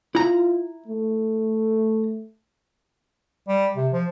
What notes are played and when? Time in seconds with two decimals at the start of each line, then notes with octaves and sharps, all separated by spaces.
0.15 E4 F4 A#5
0.88 A3
3.48 G3
3.77 C3
3.92 F3